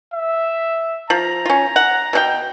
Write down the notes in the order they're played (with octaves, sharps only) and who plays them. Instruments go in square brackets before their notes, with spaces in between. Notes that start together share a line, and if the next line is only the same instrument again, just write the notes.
[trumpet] E5
[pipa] F3 [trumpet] A#5
[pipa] C#4 F4
F#5
B2 D4 G5